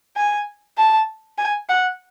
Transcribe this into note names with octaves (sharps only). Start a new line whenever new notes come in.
G#5
A5
G#5
F#5